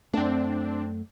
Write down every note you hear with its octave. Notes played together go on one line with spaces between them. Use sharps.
F#2 A3 C4 D4